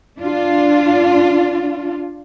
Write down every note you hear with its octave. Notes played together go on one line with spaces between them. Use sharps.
D4 F4